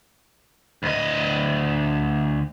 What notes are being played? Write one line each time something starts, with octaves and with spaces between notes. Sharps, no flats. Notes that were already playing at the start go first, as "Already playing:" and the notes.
D2 D#5